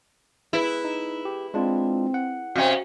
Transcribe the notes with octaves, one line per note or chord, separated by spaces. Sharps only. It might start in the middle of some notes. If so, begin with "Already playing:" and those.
E4 G#4 B4
D#4
G4
G#3 C4 D4 F4
F#5
C3 C#4 F#4 C5 D#5 F5